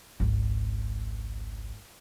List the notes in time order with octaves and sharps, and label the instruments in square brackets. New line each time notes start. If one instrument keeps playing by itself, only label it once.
[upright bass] G#1 C#2